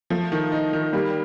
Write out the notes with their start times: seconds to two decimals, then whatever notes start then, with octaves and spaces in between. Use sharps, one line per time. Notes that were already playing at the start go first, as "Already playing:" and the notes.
0.10 F3 A3
0.32 D#3
0.52 D#4
0.73 D#3
0.93 G3 A#3